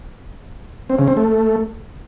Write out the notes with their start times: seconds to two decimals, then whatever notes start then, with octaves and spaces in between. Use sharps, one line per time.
0.90 C4
0.99 C#3
1.08 C4
1.17 A3